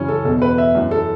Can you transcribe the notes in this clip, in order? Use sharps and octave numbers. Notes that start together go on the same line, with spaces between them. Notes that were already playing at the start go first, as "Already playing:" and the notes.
Already playing: F#2 C#3 E3 C#4
A4
E2 B2 A4
B4
E5
F#2 E3
A4